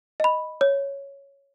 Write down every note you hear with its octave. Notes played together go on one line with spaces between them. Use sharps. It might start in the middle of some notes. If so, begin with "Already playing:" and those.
D#5 B5
C#5